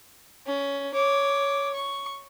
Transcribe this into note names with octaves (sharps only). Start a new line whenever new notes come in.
C#4
C#5 D6
C#6